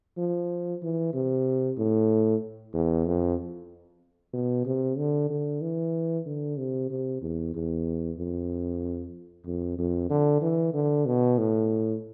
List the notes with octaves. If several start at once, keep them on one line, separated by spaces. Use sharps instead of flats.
F3
E3
C3
A2
E2
F2
B2
C3
D3
D3
E3
D3
C3
C3
E2
E2
F2
F2
F2
D3
E3
D3
B2
A2